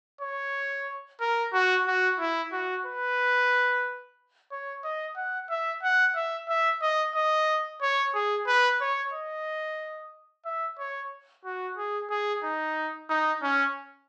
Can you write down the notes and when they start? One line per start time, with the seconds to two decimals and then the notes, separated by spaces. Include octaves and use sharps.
0.21 C#5
1.21 A#4
1.53 F#4
1.87 F#4
2.19 E4
2.53 F#4
2.86 B4
4.52 C#5
4.84 D#5
5.16 F#5
5.50 E5
5.83 F#5
6.15 E5
6.49 E5
6.82 D#5
7.15 D#5
7.82 C#5
8.15 G#4
8.47 B4
8.81 C#5
9.13 D#5
10.45 E5
10.79 C#5
11.45 F#4
11.78 G#4
12.10 G#4
12.43 D#4
13.10 D#4
13.43 C#4